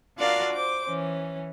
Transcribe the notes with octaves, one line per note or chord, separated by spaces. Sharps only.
D4 F4 F#4 A#4 D5 F5
C5 D6
E3 C#4